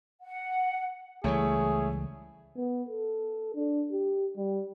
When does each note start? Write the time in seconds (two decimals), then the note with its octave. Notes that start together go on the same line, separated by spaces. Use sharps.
0.22 F#5
1.24 C#2 E3 G3 A3 E4 G#4 C#5
2.56 B3
2.89 A4
3.55 D4
3.91 G4
4.37 G3